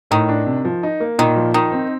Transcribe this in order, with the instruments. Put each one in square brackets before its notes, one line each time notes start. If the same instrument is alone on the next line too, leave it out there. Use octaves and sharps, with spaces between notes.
[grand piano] A2 [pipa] D#3
[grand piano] D4
C3
F3
D#4
A#3
[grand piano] A#2 [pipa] D#3
[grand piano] F3
[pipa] D#3 [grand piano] D#4
[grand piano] C4